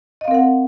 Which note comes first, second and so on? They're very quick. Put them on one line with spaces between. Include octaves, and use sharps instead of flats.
D#5 F5 C4 A#4 F#5